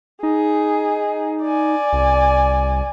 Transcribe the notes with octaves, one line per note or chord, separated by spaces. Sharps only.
D#4 G#4
D5 G#5
C2